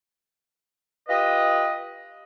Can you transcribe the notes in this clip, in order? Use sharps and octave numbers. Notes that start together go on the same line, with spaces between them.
F4 G4 B4 D#5